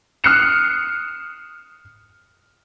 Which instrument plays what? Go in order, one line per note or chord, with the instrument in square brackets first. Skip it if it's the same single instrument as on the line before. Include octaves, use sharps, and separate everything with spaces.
[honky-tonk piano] D#6 F6 F#6 C7 C#7 E7